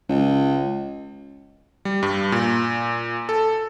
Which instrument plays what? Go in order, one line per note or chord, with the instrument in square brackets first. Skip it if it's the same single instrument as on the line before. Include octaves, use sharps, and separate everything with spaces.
[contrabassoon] C#2
[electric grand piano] G3
G2
A#2
A4